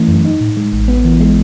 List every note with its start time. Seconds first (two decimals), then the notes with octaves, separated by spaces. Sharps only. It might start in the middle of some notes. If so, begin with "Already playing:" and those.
Already playing: E3 A3 C#4
0.08 F#2
0.25 D#4
0.41 A2
0.57 G#3
0.73 A1
0.88 B3
1.04 E3
1.20 G#3